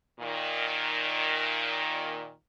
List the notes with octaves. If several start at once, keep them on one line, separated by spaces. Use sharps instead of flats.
A#2 D#3